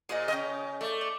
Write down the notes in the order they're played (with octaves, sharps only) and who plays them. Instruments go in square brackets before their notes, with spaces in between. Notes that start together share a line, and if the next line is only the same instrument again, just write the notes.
[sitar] A#2 [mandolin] G#4 C5 D#5
[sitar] C#3 D#5 [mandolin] G5 G#5 F6
[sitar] A3 [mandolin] D5
[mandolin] D5